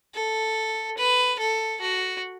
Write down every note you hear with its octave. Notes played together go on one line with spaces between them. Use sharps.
A4
B4
A4
F#4